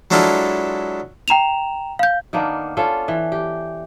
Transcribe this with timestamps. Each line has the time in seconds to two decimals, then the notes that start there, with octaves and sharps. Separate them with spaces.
0.11 F#3 G#3 D4 E4 F4 A4
1.28 G5 A#5 E7 F7
1.99 F5 G6
2.33 D#3 A#3 B3 D4
2.77 C#4 D4 F4 A4
3.08 E3
3.32 G4